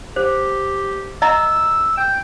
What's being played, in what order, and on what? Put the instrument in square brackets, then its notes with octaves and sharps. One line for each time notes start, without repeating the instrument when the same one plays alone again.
[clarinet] G4 [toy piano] C5
[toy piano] D#5 E5 A#5 [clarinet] E6
[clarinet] G5